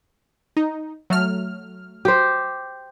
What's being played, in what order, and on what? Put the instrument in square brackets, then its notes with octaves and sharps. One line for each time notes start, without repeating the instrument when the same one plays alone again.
[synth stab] D#4
F#3 A3 F6
[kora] G4 C5